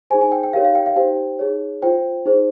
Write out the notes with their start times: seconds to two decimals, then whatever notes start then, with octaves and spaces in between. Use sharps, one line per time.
0.10 D#4 G#4 C5 G#5
0.21 G#5
0.32 G5
0.43 G5
0.53 D#4 G4 A#4 C#5 F5
0.65 F5
0.75 G5
0.86 F5
0.96 D#4 G4 C5 G5
1.39 D#4 G#4 C#5
1.82 F4 C5 G5
2.26 D#4 G#4 C5